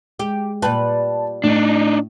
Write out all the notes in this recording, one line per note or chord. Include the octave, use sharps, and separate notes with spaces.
G#3 G4
A#2 G3 B4 A5
A2 D4 D#4